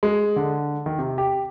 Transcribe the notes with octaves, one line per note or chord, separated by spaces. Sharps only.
G#3
D3
D#3
C3
G4